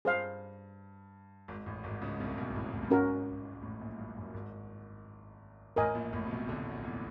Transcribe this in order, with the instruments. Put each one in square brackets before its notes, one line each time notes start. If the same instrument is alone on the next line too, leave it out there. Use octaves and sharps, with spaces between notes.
[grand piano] G2 [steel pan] G#4 C5 F5
[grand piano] G#1 G#2
A1 A2
G#1 G#2
C#2 C#3
C2 C3
B1 B2
A1 A2
A1 A2
G2
[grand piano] G#1 G#2 [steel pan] C#4 F#4 A#4
[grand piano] G#2
A1 A2
A#1 A#2
G2
F#2
G#1 G#2
[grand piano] A1 A2 [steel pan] A#4 D#5 G#5
[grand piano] A#1 A#2
A1 A2
C3
B1 B2
D2 D3
E2 E3